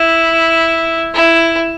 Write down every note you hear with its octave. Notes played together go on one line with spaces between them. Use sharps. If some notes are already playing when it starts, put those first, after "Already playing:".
Already playing: E4
E4